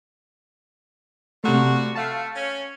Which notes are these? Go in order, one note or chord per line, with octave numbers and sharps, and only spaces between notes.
C3 F3 G3 A3 F#4
A3 F5 A5
C#4